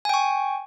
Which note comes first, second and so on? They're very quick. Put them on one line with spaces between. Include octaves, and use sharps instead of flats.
G#5 G5 C#6